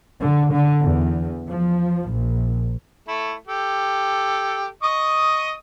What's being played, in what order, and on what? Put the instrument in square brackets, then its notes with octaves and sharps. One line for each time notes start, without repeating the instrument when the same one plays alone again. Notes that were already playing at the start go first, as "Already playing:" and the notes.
[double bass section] D3
D3
E2
F3
A#1
[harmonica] A3 E4
G4 A4
D#5 C#6 D#6